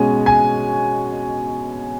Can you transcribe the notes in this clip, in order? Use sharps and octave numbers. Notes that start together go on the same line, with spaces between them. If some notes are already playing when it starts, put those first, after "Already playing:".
Already playing: B2 G#3 C#4 G#5
G#5